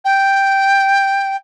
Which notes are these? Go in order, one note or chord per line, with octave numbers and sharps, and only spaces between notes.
G5